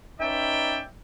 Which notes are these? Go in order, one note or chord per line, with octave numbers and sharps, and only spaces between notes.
C#4 D#4 B4 D5 E5 G5